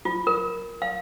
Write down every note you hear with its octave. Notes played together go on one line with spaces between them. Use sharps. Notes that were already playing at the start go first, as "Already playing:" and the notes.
F4
A#4
F5